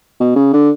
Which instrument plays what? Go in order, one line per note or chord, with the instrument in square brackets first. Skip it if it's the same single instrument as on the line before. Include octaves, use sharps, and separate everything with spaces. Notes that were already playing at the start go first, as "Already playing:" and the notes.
[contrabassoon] B2
C#3
D3